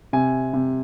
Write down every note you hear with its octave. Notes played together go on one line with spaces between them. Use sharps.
C3 G#5
C3